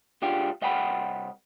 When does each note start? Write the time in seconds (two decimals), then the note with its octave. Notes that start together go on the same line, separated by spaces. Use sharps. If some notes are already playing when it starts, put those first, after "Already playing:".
0.22 C#2 G#3 D4 F4 G4
0.62 C2 D#5 F#5 G5 A5 B5